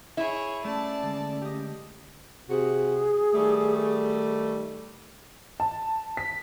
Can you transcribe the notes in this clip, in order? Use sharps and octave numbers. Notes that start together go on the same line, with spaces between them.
E4 G#4 C#5
A3 C#4 D5 A5
D3 G#3
G4 D#5
C3 F#4 G#4
D#3 G3 A3
A5
B6